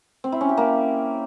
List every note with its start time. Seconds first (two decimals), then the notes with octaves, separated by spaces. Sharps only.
0.24 C4
0.32 E4
0.41 C#4
0.49 G4
0.57 A#3